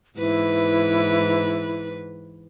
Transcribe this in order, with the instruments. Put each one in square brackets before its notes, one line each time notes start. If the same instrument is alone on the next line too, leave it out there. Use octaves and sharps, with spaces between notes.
[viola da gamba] G#2 E3 B4 [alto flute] E4